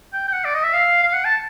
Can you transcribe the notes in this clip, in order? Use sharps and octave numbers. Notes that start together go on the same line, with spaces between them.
G5
G5
F#5
D5
D#5
E5
F5
F5
F#5
A5